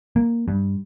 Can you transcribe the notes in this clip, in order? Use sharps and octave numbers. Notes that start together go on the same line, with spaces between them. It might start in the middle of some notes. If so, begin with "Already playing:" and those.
A#3
G2